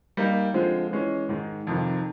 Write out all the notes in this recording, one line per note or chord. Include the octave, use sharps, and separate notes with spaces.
G3 A#3 D#4
D3 F3 G#3 C4
E3 G#3 C#4
G#2 D#3 G#3
F2 C3 D#3